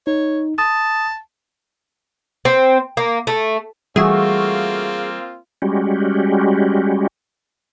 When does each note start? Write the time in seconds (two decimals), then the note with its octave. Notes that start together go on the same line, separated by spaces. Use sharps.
0.07 D#4 C#5
0.58 A5 D#6
2.45 C4
2.97 A#3
3.27 A3
3.96 E3 G3 A3 A#3 C4 F4 F#4 G#4
5.62 G3 G#3 C#4 F#4 G4